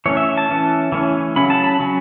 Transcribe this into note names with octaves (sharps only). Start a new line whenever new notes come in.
E3 A3 C#4 C#5
E5
A5
E3 C#4
E3 A3 C#4
C#3 F#3 C#4 B5
A5
B5
F#3 C#4